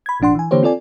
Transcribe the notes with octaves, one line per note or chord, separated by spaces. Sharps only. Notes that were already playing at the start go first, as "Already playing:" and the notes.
B5 G#6
G#1 A#2 F3 D4 F#5 C6
E3 G#5
D3 E3 A#3 G4 C5 C#5
C4 F4 A4 D5 G#5